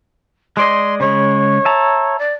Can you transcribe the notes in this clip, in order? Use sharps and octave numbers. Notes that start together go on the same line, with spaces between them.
G#3 D5 D#5 C6
C#3 G#3 C#5
E5 A5 A#5
D5